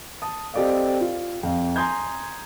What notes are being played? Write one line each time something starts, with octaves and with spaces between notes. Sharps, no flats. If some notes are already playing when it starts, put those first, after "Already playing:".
A5 D#6
C4 G4 A4 D5 D#5 F5
F4
F2 F5
G#5 A#5 C6 D#6 G6 G#6